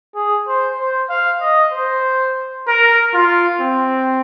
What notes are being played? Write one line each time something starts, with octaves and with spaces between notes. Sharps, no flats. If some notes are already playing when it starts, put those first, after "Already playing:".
G#4
C5
C5
F5
D#5
C5
A#4
F4
C4